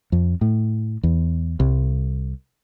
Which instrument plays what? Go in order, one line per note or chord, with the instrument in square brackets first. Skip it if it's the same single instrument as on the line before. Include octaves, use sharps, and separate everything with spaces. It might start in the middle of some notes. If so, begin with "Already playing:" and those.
[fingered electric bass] F2
A2
E2
C2